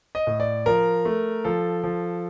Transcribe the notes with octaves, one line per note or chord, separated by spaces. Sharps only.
D#5
A2
D5
F3 A#4
A3
F3 A4
F3